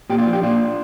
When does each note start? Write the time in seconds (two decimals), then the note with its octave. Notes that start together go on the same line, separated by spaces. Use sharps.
0.10 A#2 G4
0.18 D4 F4
0.26 F3
0.33 G4
0.43 A#2 D4 F4